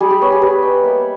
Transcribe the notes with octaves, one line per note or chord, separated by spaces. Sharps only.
G3 G#4
G4
B3 C#5
G#4
G3 B4
D#4 G5
A#3 E5